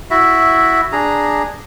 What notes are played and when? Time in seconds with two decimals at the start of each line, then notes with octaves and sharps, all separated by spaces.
0.10 E4 F#4 E5
0.92 D4 G#4 A#5